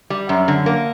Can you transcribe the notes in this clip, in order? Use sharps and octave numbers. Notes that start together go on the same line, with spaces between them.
G3
F#2
D3
A#3